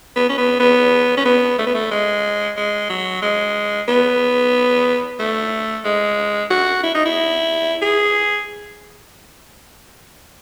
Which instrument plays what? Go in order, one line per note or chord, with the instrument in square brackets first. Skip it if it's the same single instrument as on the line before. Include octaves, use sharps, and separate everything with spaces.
[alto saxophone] B3
C#4
B3
B3
C#4
B3
A3
B3
A3
G#3
G#3
F#3
G#3
B3
A3
G#3
F#4
E4
D#4
E4
G#4